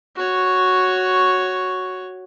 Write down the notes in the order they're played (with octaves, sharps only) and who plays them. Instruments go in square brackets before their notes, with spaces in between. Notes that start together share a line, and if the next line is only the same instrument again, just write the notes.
[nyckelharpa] F#4 C#5